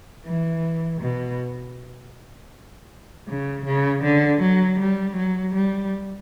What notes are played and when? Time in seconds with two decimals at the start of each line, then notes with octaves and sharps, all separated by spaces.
0.25 E3
1.01 B2
3.28 C#3
3.65 C#3
4.03 D3
4.41 F#3
4.79 G3
5.16 F#3
5.54 G3